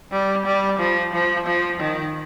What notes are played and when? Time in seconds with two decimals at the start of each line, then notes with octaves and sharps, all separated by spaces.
0.12 G3
0.46 G3
0.79 F3
1.13 F3
1.46 F3
1.80 D#3